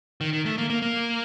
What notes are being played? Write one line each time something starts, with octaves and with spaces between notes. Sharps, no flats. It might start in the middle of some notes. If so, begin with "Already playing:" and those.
D#3
D#3
A3
A#3
A#3
A#3